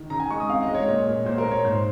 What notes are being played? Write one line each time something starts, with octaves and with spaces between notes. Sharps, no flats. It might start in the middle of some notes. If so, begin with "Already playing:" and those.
Already playing: D#3
C#3 A#5
G#5
G#3 C#6
D#6
C4 F5
D#5
G#3
C#5
A#2
A#2
A#2 C5
A#4
A#2
C#5
G#2 C5